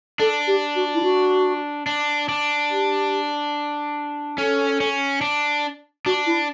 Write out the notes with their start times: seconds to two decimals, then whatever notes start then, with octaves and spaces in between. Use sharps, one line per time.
0.20 D4 A4
0.47 G4
0.76 F#4
0.95 E4
1.03 F#4
1.87 D4
2.29 D4
2.71 G4
4.38 C#4 A4
4.80 C#4
5.21 D4
6.06 D4 F#4
6.26 E4